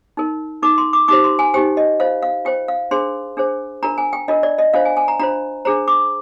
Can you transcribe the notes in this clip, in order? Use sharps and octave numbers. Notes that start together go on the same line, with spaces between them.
D#4 A#4
D#4 A#4 D6
C6
D6
D#4 G4 C5 D6
C6
G#5
D#4 G4 C5 G5
D#5
F4 C5 F5
F5
F4 C5 G5
F5
D4 G#4 C5 C6
D4 G#4 C5
D4 F4 A#4 A#5
G#5
G5
D4 F4 A#4 D#5
D5
D#5
D4 F4 C5 F5
G#5
G#5
A#5
D4 F4 C5 A#5
D4 G#4 C5 A#5
D6